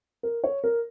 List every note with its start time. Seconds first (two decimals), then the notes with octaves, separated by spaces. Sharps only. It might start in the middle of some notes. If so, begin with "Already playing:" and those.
0.23 A#4
0.44 C#5
0.64 A#4